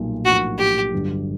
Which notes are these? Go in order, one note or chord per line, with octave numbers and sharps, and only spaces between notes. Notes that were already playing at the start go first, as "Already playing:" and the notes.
Already playing: B1 A#2 G3 A#3 D#4
B1 A2 F3 A#3 D4 F#4
G4
G1 G2 D3 F#3